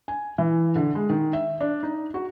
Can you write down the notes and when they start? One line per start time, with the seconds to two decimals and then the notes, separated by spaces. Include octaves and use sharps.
0.08 G#5
0.38 E3
0.75 D3
0.95 G#3
1.10 D#3
1.33 E5
1.61 D4
1.83 D#4
2.14 F#4